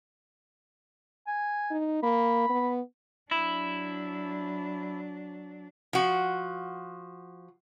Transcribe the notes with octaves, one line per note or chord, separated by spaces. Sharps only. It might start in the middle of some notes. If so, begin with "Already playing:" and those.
G#5
D#4
A#3 B5
B3
F#3 D4 E4
F3 F#4